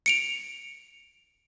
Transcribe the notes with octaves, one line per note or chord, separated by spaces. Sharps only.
C#7 D7 F7